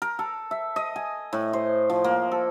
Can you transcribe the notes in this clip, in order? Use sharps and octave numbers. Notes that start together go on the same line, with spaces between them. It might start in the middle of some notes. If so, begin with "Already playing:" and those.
A#4
A4
E5
D#5
G#5
A2
C5
F3
A#3
A4